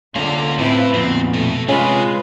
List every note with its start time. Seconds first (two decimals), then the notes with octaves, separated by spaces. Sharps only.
0.16 D3 A#3 C#4 F4 A#5
0.59 A2 C4 E4 B4
0.94 F2 A#2 B3 C4
1.34 B2 A3
1.69 C3 G#3 C#4 F4 B4